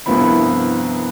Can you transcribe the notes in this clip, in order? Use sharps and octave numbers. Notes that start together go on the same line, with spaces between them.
C2 G2 F3 B3 E4 B5